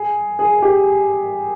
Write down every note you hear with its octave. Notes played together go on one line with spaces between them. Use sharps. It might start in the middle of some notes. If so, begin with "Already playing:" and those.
Already playing: G#4
G#4
G4